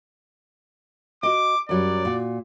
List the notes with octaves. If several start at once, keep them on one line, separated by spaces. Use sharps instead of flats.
F#4 D#5 D6
F#2 F#3 G3 D5
A#2 F#4